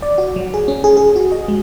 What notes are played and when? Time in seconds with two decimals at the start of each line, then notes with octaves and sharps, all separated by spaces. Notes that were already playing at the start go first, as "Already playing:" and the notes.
0.02 D5
0.18 F#4
0.36 F#3
0.54 G#4
0.68 C#4
0.84 G#4
0.97 G#4
1.16 F#4
1.32 D#5
1.48 G#3